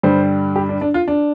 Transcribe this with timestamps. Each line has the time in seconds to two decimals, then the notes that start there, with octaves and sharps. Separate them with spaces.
0.03 G2 D3 G3 C5
0.56 G4
0.69 D4
0.81 D4
0.94 F4
1.08 D4